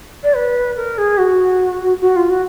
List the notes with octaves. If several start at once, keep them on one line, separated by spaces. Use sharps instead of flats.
D5
B4
A#4
G#4
F#4
F#4
F4
F#4